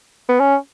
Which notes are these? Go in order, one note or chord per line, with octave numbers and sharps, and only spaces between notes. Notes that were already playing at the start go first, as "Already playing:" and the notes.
B3
C#4